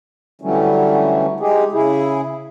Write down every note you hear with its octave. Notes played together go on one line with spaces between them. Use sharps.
D3 E3 F#3 G3 A3 C#4
G#3 D#4 G4 G#4
C#3 E4 G#4